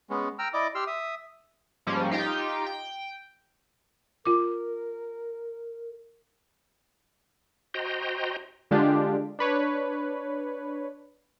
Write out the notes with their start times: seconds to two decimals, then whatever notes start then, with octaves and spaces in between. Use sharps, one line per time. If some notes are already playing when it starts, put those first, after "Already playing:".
0.10 G#3 B3 C#4
0.39 G5 A#5 E6 F6
0.54 E4 D5 D#5 D6
0.75 G4 C6 E6 F6
0.87 E5 D#6
1.87 G#2 F3 G3 A#3 C#4
2.11 D#4 F4 G4 G5
2.66 G5
4.25 F4 A#4 D6
7.74 F#4 C5 D#5 G5 A#5 C6
8.71 D3 G#3 D4 F4 G4
9.39 D4 B4 C#5